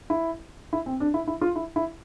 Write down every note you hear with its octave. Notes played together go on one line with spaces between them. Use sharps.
E4
E4
C4
D4
E4
E4
F4
E4
E4